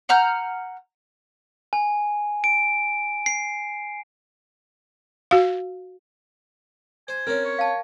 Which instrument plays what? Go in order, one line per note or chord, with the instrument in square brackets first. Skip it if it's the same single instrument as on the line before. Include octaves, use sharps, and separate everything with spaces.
[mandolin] F#5 A#5 F6 G6
[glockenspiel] G#5
D7
C7
[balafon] F#4 F5
[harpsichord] C5 [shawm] G#5
[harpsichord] C4 C#4 [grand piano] A#4
[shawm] C#5
[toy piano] F5 A5